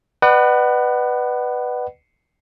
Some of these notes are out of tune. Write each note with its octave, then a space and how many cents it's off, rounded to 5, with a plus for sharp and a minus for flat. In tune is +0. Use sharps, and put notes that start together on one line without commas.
B4 +0 D5 +45 F#5 +25